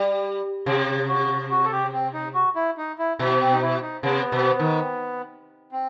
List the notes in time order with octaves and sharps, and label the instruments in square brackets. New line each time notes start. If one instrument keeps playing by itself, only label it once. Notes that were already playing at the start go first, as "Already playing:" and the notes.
Already playing: [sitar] G3
[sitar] C3 [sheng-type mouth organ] G4
[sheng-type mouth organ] F#4
F#4
A4
G4
C4
D#4
F#4
E4
D#4
E4
[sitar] B2 [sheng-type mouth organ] E4
[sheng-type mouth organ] C4
D#4
E4
D#4
[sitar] C3 [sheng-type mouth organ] B3
[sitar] B2
D#3
[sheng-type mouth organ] C4